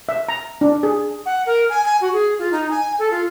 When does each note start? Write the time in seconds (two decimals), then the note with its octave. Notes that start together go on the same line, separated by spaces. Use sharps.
0.09 E5
0.29 A#5
0.61 D4
0.83 G#4
1.25 F#5
1.46 A#4
1.70 G#5
1.84 G#5
2.01 F#4
2.13 G#4
2.39 F4
2.52 D#4
2.71 G#5
2.99 A4
3.11 F4